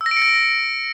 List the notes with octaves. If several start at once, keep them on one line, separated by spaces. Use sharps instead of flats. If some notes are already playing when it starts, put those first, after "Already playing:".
E6
A#6
D7
C#7
A#6